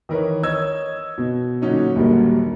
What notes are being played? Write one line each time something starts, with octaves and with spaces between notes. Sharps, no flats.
D#3 E3 A#4 B4 C#5
C#5 D#5 E6 G#6
B2
A#2 D3 F#3 C#4 D#4
A#1 D#2 D3 F#3 G3 A#3